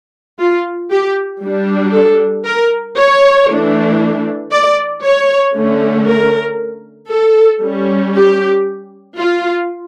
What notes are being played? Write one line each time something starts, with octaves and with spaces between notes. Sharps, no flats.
F4
G4
G3 D4
A4
A#4
C#5
E3 A3 D4
D5
C#5
D3 A3 C#4
A#4
A4
G3 C#4
G4
F4